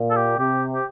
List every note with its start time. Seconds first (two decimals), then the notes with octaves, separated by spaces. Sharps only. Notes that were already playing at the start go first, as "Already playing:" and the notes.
Already playing: A#2
0.10 A4
0.16 G4
0.38 C3 G4
0.75 G4